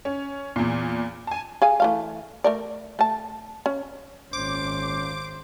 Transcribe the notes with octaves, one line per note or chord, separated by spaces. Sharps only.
C#4
E2 A#2
G#5 A5
G#4 F5 G#5
E3 A3 F5
A3 A#4 D5
A3 A5
C#4
G#1 A#2 C#4 C5 D6